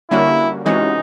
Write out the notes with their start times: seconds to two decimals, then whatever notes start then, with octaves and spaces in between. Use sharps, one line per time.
0.11 D3 G3 A#3 C#4 E4 F#4
0.65 C3 E3 G#3 C#4 D#4 F#4